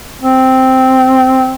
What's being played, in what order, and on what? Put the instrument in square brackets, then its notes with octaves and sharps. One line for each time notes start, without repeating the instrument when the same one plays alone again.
[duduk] C4